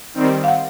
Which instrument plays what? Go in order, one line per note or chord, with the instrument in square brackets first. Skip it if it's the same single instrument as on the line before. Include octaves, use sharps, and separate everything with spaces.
[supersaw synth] D#3 G3 C4
[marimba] F5
F#5